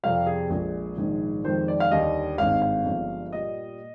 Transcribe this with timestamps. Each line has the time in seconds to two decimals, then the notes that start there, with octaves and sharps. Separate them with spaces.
0.03 F2 C3 G3 F5
0.27 G#4
0.50 A#1 A#2 G#3 G#4
0.97 A#1 G#2 D#3 G#3
1.44 F2 D#3 G#3 C5
1.68 D5
1.80 F5
1.91 D#2 D3 G3 D#5
2.38 G#1 G2 D#3 G#3 F5
2.62 F5
2.85 G1 G2 F3 G#3
3.32 A#2 G3 D#5